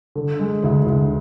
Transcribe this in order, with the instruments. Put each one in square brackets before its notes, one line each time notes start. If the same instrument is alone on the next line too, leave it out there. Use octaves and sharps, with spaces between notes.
[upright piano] D3
G#3
D2
D2